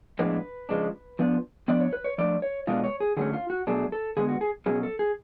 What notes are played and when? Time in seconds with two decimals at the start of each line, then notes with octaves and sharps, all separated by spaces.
0.19 A2 F3 G#3 B3 D4 B4
0.69 C#3 F3 G#3 D4
1.19 F3 B3 D4
1.68 F3 B3 D4 D5
1.80 C#5
1.93 B4
2.04 C#5
2.18 F3 A3 D4 D5
2.42 C#5
2.67 B2 G#3 B3 D4 F4
2.84 C#5
3.00 G#4
3.17 D3 F#3 A3 C#4 G#4
3.33 F4
3.50 F#4
3.67 B2 F#3 A3 D4 G#4
3.92 A4
4.17 D3 G#3 B3 G#4
4.29 F#4
4.41 G#4
4.66 B2 F#3 C#4 G#4
4.83 A4
4.99 G#4